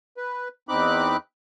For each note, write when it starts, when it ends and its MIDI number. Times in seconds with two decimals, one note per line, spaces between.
0.17 0.48 71
0.69 1.17 40
0.69 1.17 60
0.69 1.17 63
0.69 1.17 83
0.69 1.17 86
0.69 1.17 90